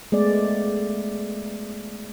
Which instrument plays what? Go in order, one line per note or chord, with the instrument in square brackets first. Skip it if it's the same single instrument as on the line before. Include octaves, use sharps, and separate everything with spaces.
[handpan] G#3 A3 B3 D5